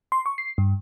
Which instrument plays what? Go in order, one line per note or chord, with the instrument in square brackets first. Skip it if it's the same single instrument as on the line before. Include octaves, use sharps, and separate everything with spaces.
[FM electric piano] C6
C#6
C7
G2